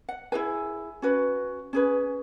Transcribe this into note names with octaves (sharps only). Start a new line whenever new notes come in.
F#5
E4 G#4 B4 G#5
C#4 F#4 B4
C#4 G#4 B4